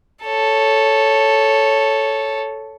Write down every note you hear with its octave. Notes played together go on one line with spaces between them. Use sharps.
A4 C#5